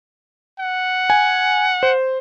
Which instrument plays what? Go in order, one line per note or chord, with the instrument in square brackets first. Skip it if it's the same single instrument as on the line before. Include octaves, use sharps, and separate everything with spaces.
[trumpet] F#5
[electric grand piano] G#5
C5